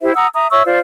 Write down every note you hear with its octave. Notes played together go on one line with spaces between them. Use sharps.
E4 G4 C5 E5
F#5 A#5 D#6 E6
E5 A#5 D#6
C#5 E5 C#6 E6
F4 C5 D5